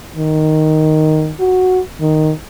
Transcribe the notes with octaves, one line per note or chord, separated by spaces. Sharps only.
D#3
F#4
D#3